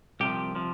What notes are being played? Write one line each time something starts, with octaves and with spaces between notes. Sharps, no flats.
C2 C3 F3 G4
C3 F3